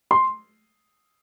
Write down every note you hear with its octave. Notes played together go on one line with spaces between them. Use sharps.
C6